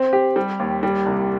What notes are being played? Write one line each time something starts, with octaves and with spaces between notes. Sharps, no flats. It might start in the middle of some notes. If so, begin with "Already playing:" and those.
Already playing: C4
G4
G3
D#2
G3
C2